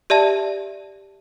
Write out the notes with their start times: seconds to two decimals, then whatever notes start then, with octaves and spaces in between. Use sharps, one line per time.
0.10 G4 D5 E5 A5